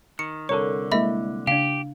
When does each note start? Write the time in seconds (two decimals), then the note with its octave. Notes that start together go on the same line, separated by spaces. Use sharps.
0.19 D#3 C#7
0.49 C2 D3 A4 A#4 C#5 C#6
0.92 G#3 A#3 E4 D#5 E5 B5
1.47 C#3 D4 G4 F5